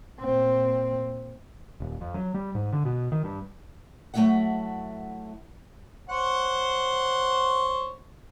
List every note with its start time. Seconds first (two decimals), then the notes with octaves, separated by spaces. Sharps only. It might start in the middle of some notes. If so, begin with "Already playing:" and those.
0.20 A#2 C4
1.80 D#1
2.01 F2
2.14 F#3
2.34 G3
2.55 G#2
2.72 D3
2.85 B2
3.12 D#3
3.24 G2
4.14 F#3 A3 A#3 E4 E5 F#5
6.09 C5 C#5 F#5